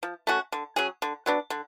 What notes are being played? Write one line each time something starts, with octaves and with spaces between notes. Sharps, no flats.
F3
A3 C#4 F#4
D3
F#3 C#4 G#4
D3
F#3 B3 D4
D3